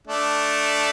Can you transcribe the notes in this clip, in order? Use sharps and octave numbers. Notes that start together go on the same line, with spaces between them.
A3 D4